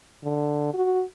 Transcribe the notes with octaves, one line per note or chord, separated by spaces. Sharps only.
D3
F#4